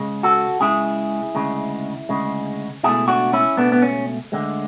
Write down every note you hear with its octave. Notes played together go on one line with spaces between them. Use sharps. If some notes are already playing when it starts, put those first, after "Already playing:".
Already playing: C#2 C#3 G#3
F#4 A4
C#2 C#3 G#3 E4 G#4
D2 C#3 G#3
D2 C#3 G#3
C#2 B2 A3 E4 G#4
D4 F#4
C#4 E4
C#2 B2 A3 B3 D4
B3
C#4
D2 D3 G#3